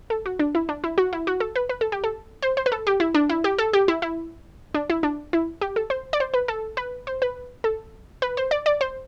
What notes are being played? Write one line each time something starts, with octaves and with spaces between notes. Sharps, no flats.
A4
F#4
D4
E4
D4
E4
F#4
E4
F#4
A4
B4
B4
A4
G4
A4
C5
C5
B4
A4
G4
E4
D4
E4
G4
A4
G4
E4
E4
D4
E4
D4
E4
G4
A4
C5
D5
C5
B4
A4
B4
C5
B4
A4
B4
C5
D5
D5
C5